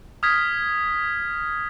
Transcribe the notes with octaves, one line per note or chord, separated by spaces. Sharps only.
D#6 F6 G#6 B6